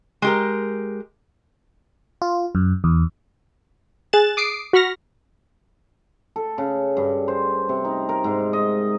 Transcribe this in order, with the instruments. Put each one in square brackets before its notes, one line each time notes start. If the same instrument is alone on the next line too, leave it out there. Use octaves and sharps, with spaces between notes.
[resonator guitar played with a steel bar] G#3 G4 A#4
[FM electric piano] F4
F#2
E2
[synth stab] G#4 F#6 A6 E7
D6 D#6 C7 D7
F#4 B5 C#6 F6 A#6
[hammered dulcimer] A4
C#3
G2
C5
C3
D#4
A#4
G#2
D#5